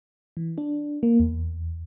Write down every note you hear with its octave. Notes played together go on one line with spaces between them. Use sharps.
E3
D4
A#3
E2